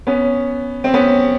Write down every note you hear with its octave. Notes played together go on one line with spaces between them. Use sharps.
B3 C#4
C4
B3 C#4